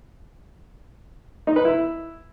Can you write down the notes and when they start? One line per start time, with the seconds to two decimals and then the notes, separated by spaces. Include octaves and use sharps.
1.47 D#4
1.56 B4
1.65 E4